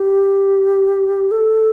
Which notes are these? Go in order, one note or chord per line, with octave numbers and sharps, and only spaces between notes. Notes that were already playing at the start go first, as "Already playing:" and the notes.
Already playing: G4
A4